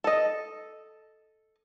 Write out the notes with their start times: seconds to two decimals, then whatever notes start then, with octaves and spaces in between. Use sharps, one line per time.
0.04 A4 D#5